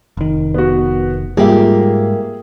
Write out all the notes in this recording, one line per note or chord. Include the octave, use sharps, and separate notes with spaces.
F1 D#3
B3 F#4
G#2 G3 A#3 F4 G4 G#4 E5